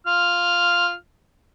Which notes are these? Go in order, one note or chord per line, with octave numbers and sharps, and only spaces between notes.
F4 F6